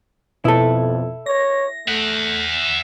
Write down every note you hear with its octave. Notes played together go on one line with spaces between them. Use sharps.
F2 B2 E4 A4
C#5 A#6
A3 E5 F#5